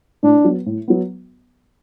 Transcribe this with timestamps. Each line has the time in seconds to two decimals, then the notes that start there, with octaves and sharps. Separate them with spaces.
0.23 A2 D4
0.45 F#3 B3
0.66 A2
0.88 F#3 B3